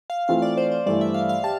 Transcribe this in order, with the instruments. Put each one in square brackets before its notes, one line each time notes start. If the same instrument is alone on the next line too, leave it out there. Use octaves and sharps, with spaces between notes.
[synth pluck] F5
[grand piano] E3 A3 C4 F4 [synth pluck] F5
[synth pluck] D5
C5
C5
[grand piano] G2 E3 A3 E4 [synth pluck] D5
[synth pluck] E5
F5
F5
[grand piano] G4 [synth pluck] A5